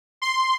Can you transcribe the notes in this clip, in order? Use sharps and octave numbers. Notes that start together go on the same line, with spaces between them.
C6